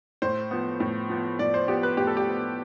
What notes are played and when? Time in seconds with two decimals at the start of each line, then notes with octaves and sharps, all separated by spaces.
0.22 A2 C5
0.51 F3 B3
0.80 A2
1.10 F3 B3
1.39 A2 D5
1.54 C5
1.68 F3 B3 G4
1.83 B4
1.97 A2 G4
2.07 A4
2.17 G4
2.27 F3 B3